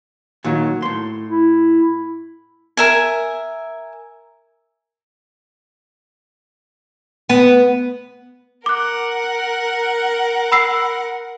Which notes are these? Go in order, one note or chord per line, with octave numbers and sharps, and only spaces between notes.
A#2 D#3 F#3
A2 C6
E4
A#4 E5 G#5
B3
A#4 F#5 D6 F#6
B5 E6 C7